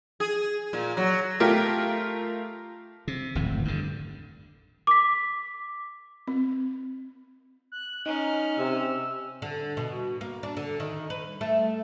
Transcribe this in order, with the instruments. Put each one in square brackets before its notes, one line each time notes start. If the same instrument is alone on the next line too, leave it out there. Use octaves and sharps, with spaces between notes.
[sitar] G#4
A#2
F#3
[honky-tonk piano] A3 F4 G4 A#4
[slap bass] C3
D1 G#1 F2 A2
G2 D3
[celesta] D6 B6
[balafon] C4
[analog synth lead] F#6
[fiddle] C#4 F6 [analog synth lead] D#4
[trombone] C3 [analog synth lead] E6
[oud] D3
B2
A#3
D4
D3
D#3
B4
A3